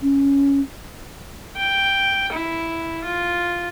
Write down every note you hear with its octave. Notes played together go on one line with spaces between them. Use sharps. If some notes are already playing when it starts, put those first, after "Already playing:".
C#4
G5
E4
F4